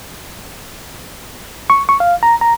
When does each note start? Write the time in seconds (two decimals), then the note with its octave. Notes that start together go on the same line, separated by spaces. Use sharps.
1.70 C#6
1.89 C#6
2.00 F5
2.23 A#5
2.41 A#5